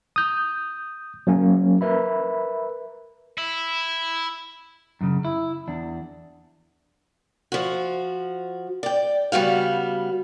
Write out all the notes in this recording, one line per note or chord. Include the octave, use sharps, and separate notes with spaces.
D#6 G6
F#3 A#3 C#4
A#4 B4 E5 B5
E4
F#2 C#3
E4
E2 D4
F3 F#4
D5 G5
C#3 G3 B3 F#4 F5